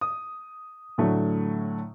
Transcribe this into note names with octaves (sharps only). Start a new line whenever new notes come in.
D#6
A2 D3 F#3 A3